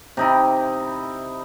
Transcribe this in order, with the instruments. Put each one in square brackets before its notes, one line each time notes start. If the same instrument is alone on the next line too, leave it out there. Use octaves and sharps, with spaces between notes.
[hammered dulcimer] C3 D#4 E4